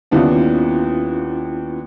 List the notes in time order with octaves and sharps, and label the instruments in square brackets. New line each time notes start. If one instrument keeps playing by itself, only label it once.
[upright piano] D#2 B3 D4 [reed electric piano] C#4 E4 F4